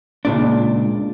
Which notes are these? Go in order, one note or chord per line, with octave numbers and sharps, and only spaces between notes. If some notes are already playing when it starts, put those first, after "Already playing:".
C#2 A#2 D4